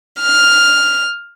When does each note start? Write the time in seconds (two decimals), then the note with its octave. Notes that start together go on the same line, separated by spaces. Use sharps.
0.20 F6